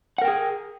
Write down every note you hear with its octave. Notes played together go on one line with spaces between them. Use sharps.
G#4 A#4 F#5 G5